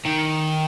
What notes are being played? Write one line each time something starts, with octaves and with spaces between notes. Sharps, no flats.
D#3